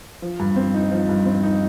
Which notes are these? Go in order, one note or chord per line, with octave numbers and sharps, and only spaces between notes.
F3
G2
C4
D#4
F3
G2
C4
D#4